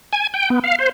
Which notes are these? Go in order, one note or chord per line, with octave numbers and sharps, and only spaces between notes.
G#5
G5
B3
F5
C5